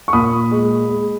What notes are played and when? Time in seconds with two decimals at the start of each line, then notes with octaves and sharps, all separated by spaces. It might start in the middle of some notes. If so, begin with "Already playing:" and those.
0.08 C#6
0.13 A#2 B5 D#6
0.51 G#3
0.89 G#3